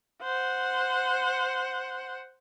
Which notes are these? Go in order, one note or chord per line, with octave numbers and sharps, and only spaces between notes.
C5 F#5